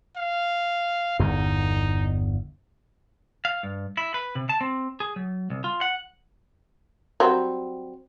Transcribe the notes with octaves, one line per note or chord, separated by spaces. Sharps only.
F5
G1 E2 D#4
F5
G2
E4
B4
C3
A5
C4
G#4
F#3
C2
F4
F#5
F#3 G3 C4